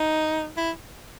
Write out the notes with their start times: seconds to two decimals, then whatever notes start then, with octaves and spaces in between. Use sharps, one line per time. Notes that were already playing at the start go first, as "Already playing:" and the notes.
Already playing: D#4
0.57 E4